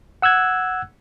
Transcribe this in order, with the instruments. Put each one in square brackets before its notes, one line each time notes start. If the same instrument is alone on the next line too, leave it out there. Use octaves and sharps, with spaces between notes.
[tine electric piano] F#5 E6 F#6 G#6